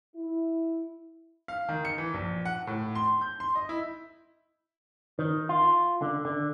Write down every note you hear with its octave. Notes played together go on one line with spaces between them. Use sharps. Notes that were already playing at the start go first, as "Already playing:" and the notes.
E4
F5
D#3
C#7
E3
A#1
F#5
A2
C6
G6
C6
D#5
E4
D#3
F4
D3
D3